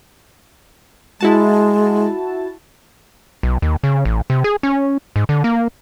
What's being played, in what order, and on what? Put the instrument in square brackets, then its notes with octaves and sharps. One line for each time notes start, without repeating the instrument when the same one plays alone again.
[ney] G#3 [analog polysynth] E4 F#4 A5
[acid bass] B1
D#2
C#3
A1
C3
G#4
C#4
G#2
D3
A#3